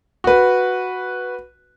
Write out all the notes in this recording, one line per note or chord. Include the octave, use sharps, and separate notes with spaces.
F#4 B4